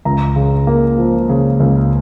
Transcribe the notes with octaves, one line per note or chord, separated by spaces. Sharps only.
C#2 A#5
C#3
A#3
F3
C#3
C#2